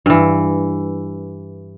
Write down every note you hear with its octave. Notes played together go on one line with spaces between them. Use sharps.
G2 E3